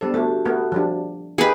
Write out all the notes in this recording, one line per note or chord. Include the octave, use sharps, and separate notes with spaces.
G3 B3 D4 A4 C5
A3 D4 F#4 G4 A5
A3 B3 A#4
F3 G3 D4
A#3 D#4 G4 G#4 B4 D#5